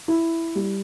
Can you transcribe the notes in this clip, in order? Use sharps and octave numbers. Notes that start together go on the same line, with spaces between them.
E4
G3